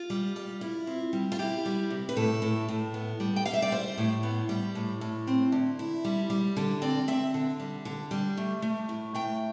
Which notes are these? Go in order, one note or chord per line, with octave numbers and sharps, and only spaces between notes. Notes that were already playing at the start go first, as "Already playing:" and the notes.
Already playing: F4
G3
G3
E4
C4
G3
F4
E4 G4
G3
C3
B4
A2 A4
A2
A2
B3
G3
G5
G3 F5
E5
D5
G3 C5
A2
B3
G3
A2
A2
C4
D3
E4
G3
G3
D3
C4 D5
C4 E5
D3
G3
D3
G3
A3
A3
A2
A3 G5